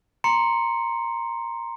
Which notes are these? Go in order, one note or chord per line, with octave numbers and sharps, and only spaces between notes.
A#5 C6 C#7